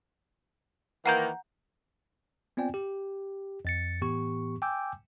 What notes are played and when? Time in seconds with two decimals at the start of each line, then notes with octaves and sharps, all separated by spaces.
1.06 D#3 E3 A#3 F#5 A#5 G6
2.57 B3 C4 F4 D5 G5 G#5
2.74 G4
3.65 F2 A6 C#7
4.01 A2 E3 B3 G4 C#6
4.62 G5 G#5 D6 E6 G6